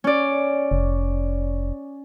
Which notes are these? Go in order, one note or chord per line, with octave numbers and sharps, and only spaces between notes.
C#4 D5
F1